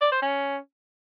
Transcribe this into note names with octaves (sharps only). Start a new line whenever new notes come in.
D5
C5
C#4